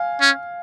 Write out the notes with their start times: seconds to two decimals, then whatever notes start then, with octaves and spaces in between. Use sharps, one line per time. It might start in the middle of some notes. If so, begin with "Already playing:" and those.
Already playing: F5 G#5
0.21 C#4